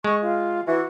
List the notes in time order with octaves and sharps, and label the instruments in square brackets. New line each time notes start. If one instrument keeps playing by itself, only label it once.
[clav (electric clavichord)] G#3 [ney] C#6
[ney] F4
[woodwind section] E3 [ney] F#4